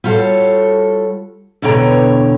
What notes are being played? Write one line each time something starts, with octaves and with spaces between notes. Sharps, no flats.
G3 F4 F#4 A4 C#5
E2 B2 D3 C#5 G5 A#5